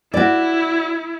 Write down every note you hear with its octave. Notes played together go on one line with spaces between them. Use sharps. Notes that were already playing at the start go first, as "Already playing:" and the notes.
E4 F#4 D5